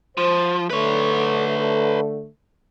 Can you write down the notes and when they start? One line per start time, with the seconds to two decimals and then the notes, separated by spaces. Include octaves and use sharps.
0.17 F3 C5
0.70 D3 A3 B4 C#5